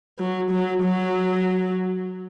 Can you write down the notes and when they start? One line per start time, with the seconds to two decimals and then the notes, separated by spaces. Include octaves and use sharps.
0.19 F#3
0.51 F#3
0.83 F#3